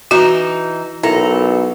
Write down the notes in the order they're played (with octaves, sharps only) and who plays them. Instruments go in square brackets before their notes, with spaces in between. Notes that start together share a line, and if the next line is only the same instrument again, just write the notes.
[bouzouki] E3 D#4 [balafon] F#4
[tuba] B1 [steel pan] E4 A#4 A#5 [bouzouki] A4